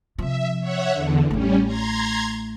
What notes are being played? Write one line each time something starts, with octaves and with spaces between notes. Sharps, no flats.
C3 F3 E5
C#5 E5 F#5
E2 D3
A1 G3 A3 C#4
A#5 C6 G#6